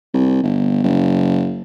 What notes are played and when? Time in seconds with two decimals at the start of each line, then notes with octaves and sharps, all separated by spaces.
0.14 C2
0.43 G1
0.83 F#1